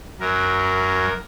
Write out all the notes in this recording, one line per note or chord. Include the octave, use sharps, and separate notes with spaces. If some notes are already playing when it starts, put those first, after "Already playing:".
F#2 F#3 A#4